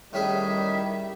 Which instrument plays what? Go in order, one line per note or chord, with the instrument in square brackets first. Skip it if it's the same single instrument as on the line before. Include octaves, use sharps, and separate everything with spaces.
[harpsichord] A2 C#4 G#4 [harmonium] D#3 [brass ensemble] G3 [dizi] E5